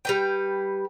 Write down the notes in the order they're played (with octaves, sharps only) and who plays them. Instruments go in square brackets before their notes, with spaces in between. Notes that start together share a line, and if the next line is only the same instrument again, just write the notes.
[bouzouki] G3 B4 G5